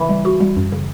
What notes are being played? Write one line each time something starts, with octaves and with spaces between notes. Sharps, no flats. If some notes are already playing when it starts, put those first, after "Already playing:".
Already playing: C#3 E3
G3
F#4
G3
F#2
C#3